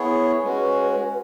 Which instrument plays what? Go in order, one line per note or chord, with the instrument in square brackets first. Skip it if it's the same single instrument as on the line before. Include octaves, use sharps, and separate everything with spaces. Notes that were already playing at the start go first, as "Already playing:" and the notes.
Already playing: [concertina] B3 E4 G#4 C#5
[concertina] G#3 C#4 F#4 [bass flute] B4